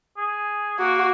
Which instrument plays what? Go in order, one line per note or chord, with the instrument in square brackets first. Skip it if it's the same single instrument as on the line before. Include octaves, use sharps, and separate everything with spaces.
[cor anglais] G#4
[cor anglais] A#3 [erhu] F#4